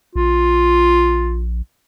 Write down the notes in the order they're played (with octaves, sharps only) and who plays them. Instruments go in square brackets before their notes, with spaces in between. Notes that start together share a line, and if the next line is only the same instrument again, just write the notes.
[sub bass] A#1 [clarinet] F4